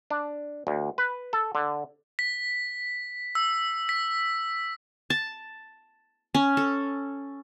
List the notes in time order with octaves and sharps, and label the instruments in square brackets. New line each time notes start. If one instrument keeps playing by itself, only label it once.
[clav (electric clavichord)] D4
D2
B4
A4
D3
[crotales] B6
E6
B6
[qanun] A5
C#4
A4